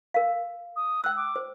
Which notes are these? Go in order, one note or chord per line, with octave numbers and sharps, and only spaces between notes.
A#4 F5
D#6
G5 E6 F#6
D6
C5